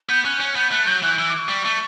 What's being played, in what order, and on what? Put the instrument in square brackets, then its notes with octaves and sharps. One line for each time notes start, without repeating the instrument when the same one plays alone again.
[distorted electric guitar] B3 [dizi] G6
[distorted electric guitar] C#4 [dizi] F#6
[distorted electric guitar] C#4
[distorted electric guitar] B3 [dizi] G6
[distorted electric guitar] A3 [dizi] F#6
[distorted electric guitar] F#3 [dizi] G6
[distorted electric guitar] E3 [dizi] F#6
[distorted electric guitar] E3 [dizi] E6
[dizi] D6
C#6
[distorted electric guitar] G3
A3